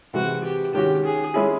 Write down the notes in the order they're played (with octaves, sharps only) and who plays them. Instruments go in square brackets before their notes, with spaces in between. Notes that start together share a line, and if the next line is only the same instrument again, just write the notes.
[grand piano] C3 E3 G#3 [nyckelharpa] F#4
[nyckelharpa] G4
[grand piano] D#3 G#3 C#4 F#4 [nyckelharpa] G4
[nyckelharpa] G#4
[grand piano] G#3 C#4 E4 G#4